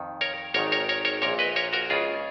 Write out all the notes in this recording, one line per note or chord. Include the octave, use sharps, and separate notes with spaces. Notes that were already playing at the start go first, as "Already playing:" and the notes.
Already playing: F2 D#3
A#4 C#5
G#1 G#2 D#3 A#4 C#5
A#4 C#5
A#4 C#5
A#4 C#5
A#1 A#2 A#4 C#5
B4 D#5
A#4 C#5
F#4 A#4
C#2 C#3 F4 G#4